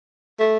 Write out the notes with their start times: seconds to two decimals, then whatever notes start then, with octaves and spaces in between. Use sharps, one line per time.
0.39 A3